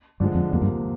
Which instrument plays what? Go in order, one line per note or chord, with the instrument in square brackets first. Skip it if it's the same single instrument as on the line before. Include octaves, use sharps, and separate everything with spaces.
[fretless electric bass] G2 [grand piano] D3 F3 G#3
[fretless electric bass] F2
[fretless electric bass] F2 [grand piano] C3 F3 A#3
[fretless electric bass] G2